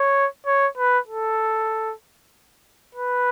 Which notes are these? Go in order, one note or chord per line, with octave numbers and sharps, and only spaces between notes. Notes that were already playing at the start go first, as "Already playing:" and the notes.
Already playing: C#5
C#5
B4
A4
B4